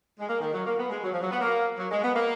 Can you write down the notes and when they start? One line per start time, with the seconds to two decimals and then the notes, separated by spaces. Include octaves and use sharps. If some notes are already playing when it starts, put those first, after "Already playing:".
0.19 G#3
0.29 A#3
0.41 D#3
0.53 F#3
0.66 A#3
0.79 B3
0.90 G#3
1.03 F#3
1.13 F3
1.21 F#3
1.31 B3
1.41 A#3
1.78 F#3
1.91 G#3
2.03 B3
2.16 A#3